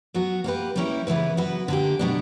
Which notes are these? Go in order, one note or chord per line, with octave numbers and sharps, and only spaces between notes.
F#3 B3 F#4
A#3 D4 G4 B4
G3 A#3 C#4 E4 G4
C#3 E3 B3 E4 B4
F#3 B3 F#4 B4
D3 A#3 D4 G4
B2 F#3 B3 D4